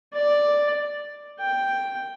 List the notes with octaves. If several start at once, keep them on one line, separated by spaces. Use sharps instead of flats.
D5
G5